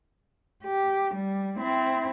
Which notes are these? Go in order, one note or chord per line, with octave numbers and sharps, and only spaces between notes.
G4
G3
C4 E4